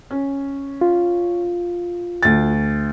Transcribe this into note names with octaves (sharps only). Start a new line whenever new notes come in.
C#4
F4
D2 A6